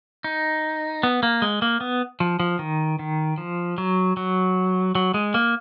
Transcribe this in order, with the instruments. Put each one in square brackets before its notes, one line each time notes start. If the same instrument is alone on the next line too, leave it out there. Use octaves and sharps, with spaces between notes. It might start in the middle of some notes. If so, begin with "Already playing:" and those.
[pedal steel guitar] D#4
B3
A#3
G#3
A#3
B3
F3
F3
D#3
D#3
F3
F#3
F#3
F#3
G#3
A#3